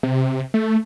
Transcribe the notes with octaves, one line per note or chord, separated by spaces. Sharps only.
C3
A3